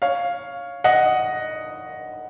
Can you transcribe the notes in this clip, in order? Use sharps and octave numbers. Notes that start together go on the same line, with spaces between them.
C#5 F5
D#5 F#5